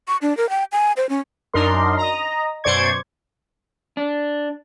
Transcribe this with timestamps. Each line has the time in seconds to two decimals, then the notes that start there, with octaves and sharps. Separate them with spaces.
0.08 C#6
0.22 D4
0.37 A#4
0.50 G5
0.72 G#5
0.97 C5
1.09 C#4
1.54 F#2 D4 D#4 A#4 C6
1.97 D#5 A#5
2.64 F#2 B2 C5 D5 C#6 G#6
3.97 D4